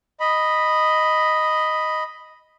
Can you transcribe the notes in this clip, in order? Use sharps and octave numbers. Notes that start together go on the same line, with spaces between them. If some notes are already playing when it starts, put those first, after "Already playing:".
D#5 B5